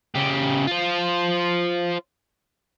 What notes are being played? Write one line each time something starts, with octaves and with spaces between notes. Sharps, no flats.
C#3 G4
F4 C5